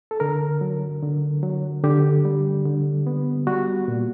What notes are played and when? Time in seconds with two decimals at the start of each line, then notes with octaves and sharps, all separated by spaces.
0.11 A4
0.20 D3 A#4
0.61 F#3
1.02 D3
1.43 F#3
1.84 D3 G4
2.25 G3
2.65 D3
3.07 B3
3.47 G3 F#4
3.88 A#2